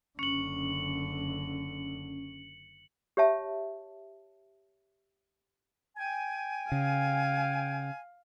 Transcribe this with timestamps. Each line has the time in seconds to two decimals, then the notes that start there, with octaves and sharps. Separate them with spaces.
0.19 F#1 D3 C#4 C#7 F#7
3.17 G4 C#5 E5 A5
5.97 G5 G#5
6.72 C#3 F5